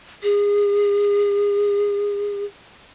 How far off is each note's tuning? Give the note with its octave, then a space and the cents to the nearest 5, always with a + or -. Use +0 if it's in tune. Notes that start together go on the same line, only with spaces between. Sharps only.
G#4 -30